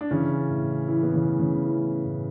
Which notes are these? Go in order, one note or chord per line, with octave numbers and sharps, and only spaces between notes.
D4
C#3 E3 C#4
A2
A1 E3 E4
B3
C#3 C#4
A1
C#3 C#4
E3 E4
A2